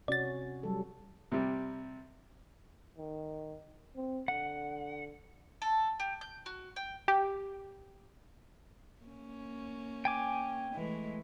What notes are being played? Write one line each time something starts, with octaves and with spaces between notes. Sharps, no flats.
C3 C#4 F#4 D5 A6
F#3 G3 A4
C3 G3
D#3
C4
D3 F#5
A4
G4
G6
F#4
G5
G4
A#3 C#4
G5 G#5 D6
E3 G#3 A3